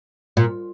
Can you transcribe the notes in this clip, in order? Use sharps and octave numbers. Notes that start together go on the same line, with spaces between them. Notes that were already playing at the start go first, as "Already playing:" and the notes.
A#2